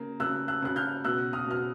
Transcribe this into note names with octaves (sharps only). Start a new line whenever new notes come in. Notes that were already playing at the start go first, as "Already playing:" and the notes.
Already playing: C#3 A#3
C#3 E6 F#6
E6 F#6
C#3 F#6
F6 G6
B2 E6 F#6
D#6 F6
B2 F6